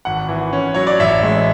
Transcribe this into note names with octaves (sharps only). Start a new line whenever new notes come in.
G#1 F#5
E3
C#4
F#3 C#5
D5
A1 E5
G#3